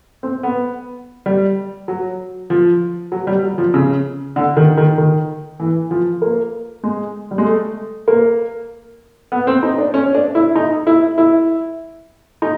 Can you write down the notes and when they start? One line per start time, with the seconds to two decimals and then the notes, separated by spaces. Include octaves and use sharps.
0.23 C4
0.43 B3
1.26 G3
1.88 F#3
2.50 F3
3.12 F#3
3.27 G3
3.43 F#3
3.58 F3
3.74 C#3
4.36 D3
4.57 D#3
4.77 D#3
4.98 D#3
5.60 E3
5.91 F3
6.22 A#3
6.84 G#3
7.31 G3
7.38 G#3
7.46 A3
8.08 A#3
9.32 B3
9.47 C4
9.63 D#4
9.78 D4
9.94 C#4
10.15 D4
10.35 E4
10.56 D#4
10.87 E4
11.18 E4
12.42 D#4